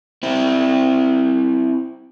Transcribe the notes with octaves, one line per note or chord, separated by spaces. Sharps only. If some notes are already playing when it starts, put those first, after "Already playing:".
C4 E4